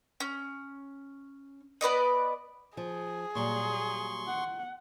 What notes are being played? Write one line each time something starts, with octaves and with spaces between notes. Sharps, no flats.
C#4
B3 B4 D5 D#5
F3 G#4
A#2 F#3 G3 C6 C#6
F#5